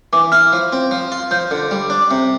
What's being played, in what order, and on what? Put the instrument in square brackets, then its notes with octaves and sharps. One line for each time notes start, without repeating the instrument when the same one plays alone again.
[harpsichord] E3 [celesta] D6
[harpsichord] E4 [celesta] F6
[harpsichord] F3
C4
F3
F4
[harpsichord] F3 [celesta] G6
[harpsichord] D3
G3
D4
C3